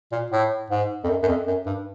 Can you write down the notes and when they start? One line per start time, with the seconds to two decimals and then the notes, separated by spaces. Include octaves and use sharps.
0.12 A#2
0.32 A2
0.70 G#2
1.04 F2
1.09 F#2
1.23 F#2
1.28 F2
1.47 F#2
1.66 G2